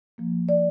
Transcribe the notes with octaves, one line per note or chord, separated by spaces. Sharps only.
F3 A#3
D5